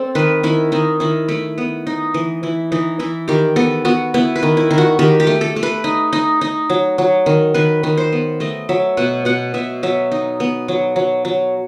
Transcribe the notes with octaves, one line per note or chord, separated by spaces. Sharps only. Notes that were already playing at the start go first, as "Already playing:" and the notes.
Already playing: C4 A4
D#3 B4
D#3 E4
D#3 D#4
D#3 E4
A3 E4
B3
D#4
E3
E3 E4
E3 D#4
E3 E4
D#3 G4
B3 A4
B3 F#4
B3 E4
B4
D#3
E4
D#3
F#4
D#3 G4
G4
A3
A4
A3
B4
D#4
D#4
D#4
F#3
F#3
D#3
D#3 B4
D#3
C5
B3
A3 D#5
F#3 E5
B2 F#5
B2 F#5
B2 E5
F#3 E5
D#4
B3
F#3
F#3
F#3